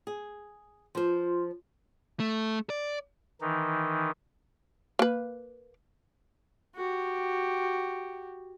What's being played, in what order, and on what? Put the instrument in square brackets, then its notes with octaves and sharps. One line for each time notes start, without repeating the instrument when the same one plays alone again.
[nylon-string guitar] G#4
[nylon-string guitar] F3 C5 [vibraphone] F4 C6
[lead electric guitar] A3
D5
[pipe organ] D#3 E3 D#4
[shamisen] A#3 B4
[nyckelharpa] F#4 G4